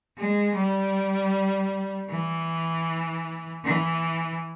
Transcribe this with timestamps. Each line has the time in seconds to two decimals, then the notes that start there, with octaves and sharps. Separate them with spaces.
0.18 G#3
0.55 G3
2.10 E3
3.65 E3